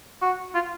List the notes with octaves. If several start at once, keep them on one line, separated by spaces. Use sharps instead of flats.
F#4
F4